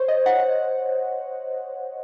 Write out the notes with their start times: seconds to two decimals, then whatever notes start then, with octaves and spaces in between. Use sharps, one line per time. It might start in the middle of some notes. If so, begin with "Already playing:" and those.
Already playing: C5 C#5
0.08 D#5
0.26 F#5